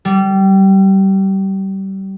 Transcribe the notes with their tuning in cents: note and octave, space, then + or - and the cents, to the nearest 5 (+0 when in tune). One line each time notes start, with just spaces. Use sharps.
G3 -25